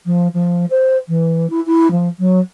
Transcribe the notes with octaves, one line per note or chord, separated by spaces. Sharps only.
F3
F3
C5
E3
E4
E4
F3
F#3